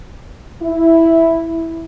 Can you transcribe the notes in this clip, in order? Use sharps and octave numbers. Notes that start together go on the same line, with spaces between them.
E4